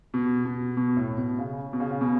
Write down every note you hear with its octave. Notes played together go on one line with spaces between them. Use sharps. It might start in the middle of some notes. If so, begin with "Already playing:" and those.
B2
B2
B2
A2
B2
C#3
B2
C#3
C#3
B2